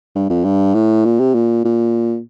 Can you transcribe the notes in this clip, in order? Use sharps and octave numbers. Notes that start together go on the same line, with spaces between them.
G2
F2
G2
A2
A#2
C3
A#2
A#2